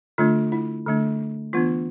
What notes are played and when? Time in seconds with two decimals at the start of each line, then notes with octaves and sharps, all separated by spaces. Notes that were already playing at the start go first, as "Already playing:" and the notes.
0.18 D3 A3 D4 F4
0.52 E4
0.87 D3 A3 D4
1.53 E3 B3 D4 F4